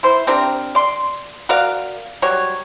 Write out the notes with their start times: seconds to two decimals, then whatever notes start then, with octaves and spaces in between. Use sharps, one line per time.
0.03 E4 C5
0.27 C4 D4 G4 A#4
0.75 D5 C6
1.49 F#4 A#4 D5 F5
2.22 F#3 G3 C#5